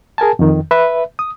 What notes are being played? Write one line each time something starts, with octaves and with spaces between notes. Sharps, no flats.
G#4 A#4 G#5 A5
F2 D#3
B4 E5
D#6